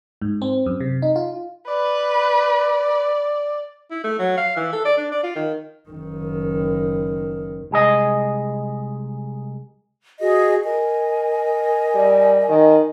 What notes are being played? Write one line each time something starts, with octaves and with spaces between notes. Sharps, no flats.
G#2
C4
F#2
C3
D#4
F4
B4 D5
E4
A3
F#3
F5
E3
A4
D5
D4
D5
F4
D#3
F#1 D#3
C2 G#3 G#4 D#5
F#4 G#4 D#5
A#4 D#5 G#5
G3
D#3